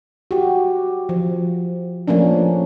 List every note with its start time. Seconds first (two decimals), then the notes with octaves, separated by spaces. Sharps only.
0.31 F#4 G4
1.09 F3
2.08 F3 A3 A#3 C#4 D4